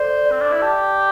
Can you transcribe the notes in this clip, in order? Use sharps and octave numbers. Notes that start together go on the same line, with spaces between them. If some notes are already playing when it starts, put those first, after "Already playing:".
Already playing: A4 C5 D5
D5
C4
D4
E4
G4 A5